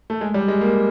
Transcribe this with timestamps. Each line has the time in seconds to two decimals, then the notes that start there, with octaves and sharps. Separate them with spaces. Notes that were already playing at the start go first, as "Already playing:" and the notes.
0.10 A3
0.21 G#3
0.34 G3
0.48 G#3
0.61 A#3